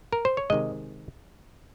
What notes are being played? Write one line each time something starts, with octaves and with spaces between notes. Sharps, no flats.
A#4
C5
C#5
C3 D#3 G#3 D#5